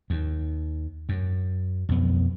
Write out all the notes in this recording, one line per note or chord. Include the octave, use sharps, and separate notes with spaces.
D#2
F#2
B1 F2 B3